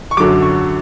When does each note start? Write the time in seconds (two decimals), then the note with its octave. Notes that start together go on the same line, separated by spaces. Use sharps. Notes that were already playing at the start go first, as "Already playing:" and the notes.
0.11 C#6
0.17 F#2 D3 F#3 D6
0.42 C#6